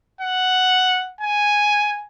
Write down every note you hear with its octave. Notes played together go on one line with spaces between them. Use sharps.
F#5
G#5